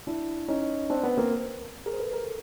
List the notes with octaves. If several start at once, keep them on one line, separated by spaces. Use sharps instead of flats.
D4 E4
C#4 D#4
C4 D4
B3
A#3 C4
G#4 A#4
C5
A4 B4
A#4
A4